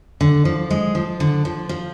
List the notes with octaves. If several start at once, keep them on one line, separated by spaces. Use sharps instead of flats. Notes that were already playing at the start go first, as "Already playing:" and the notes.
D3
F3
G#3
F3
D3
F3
F3